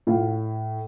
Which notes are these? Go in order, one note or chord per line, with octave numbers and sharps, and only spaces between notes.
A2 F4